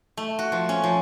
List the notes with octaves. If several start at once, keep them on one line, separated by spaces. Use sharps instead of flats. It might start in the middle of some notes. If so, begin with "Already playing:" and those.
A3
F#4
F3
C#4
F3